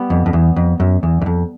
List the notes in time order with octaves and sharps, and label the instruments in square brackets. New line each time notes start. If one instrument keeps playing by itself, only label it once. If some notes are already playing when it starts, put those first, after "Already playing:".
Already playing: [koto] G3 B3
[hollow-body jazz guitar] F2
F2
E2
F2
F#2
E2
E2
F2